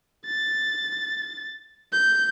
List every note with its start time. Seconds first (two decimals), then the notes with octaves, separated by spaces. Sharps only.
0.26 A6
1.93 G6